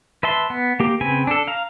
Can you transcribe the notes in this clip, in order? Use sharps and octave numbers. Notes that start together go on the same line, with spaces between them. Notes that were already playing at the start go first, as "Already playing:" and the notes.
B4 E5 A5 C6
B3
A#3 G4
C#3 C4 B4 G#5
D4 A4
F5 A#5